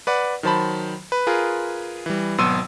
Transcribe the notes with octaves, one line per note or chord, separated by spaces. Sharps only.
B4 D5 F#5
D#3 F#3 C5 A5 B5
B4
F4 G#4 A#4 B4
E3 G3
G#1 B2 F#3 C6 E6 D#7